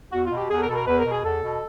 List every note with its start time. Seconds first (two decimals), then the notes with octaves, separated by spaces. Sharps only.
0.12 E2 F#4
0.26 F4
0.31 B2
0.37 G4
0.50 E2 G#4
0.58 A4
0.62 A#4
0.68 B2 A4
0.74 A#4
0.87 E2 B4
0.99 A#4
1.05 B2
1.11 G#4
1.24 E2 A4
1.43 B2